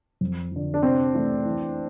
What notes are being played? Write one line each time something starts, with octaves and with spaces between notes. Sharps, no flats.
F2
D3 F3
D4
C3 C4
E3 A3 E4
E3